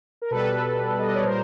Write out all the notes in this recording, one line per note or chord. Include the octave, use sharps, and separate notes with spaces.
A#4
B2 G3 A4 B4
D#5
D5
C#5
A#2 G3 A#4 C5